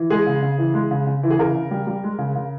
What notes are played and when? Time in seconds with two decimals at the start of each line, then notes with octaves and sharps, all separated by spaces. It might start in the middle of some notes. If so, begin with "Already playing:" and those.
Already playing: E3
0.10 G#3 G#4
0.27 C#3
0.43 C#3
0.58 E3
0.74 G#3
0.91 C#3
1.07 C#3
1.23 E3
1.30 G#4
1.39 C#3 A#4
1.55 C#3
1.71 G3
1.87 G3
2.04 G#3
2.19 C#3
2.35 C#3